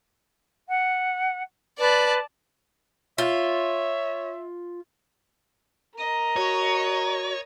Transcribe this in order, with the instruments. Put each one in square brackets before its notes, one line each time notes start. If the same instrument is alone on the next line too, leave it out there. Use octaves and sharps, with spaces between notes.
[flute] F#5
[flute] B4 [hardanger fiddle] D5 A5
[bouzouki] F4 [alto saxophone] C#5 [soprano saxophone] E5
[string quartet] A#4 D#5 [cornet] A#5
[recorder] F#4 [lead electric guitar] C#5